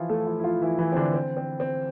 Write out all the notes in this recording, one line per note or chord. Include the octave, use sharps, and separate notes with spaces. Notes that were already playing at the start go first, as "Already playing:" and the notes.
Already playing: E3 F3 E4 F4
A3 A4
F3 F4
E4
F3 F4
E3 E4
E3 E4
C4
D3 D4
C4
C4
C4